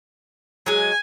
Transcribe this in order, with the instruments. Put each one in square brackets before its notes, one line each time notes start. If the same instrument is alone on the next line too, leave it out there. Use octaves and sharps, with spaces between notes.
[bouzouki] F#3 G#3 [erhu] G#5